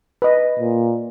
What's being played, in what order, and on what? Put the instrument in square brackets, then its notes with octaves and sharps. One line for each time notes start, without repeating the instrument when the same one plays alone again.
[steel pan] B4 D#5
[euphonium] A#2